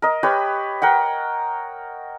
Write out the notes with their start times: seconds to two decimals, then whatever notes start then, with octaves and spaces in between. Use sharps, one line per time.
0.02 A#4 D#5
0.23 G4 B4 C#5
0.82 A#4 F#5 G5